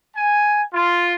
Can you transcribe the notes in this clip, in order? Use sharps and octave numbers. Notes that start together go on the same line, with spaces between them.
G#5
F4